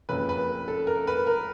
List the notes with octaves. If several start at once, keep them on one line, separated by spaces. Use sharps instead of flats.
F#1 F2 C#3 B4
B4
A4
A#4
B4
A#4